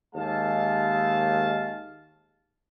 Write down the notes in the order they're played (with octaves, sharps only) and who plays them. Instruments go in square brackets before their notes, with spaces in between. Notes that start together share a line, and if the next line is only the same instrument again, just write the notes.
[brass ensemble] D#2 G#3 F5 A5